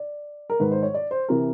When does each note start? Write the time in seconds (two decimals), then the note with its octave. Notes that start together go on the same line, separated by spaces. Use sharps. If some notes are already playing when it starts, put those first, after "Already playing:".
Already playing: D5
0.50 A#4
0.60 G#2 D#3 B4
0.71 C5
0.83 C#5
0.94 D5
1.11 C5
1.29 C3 E3 A#4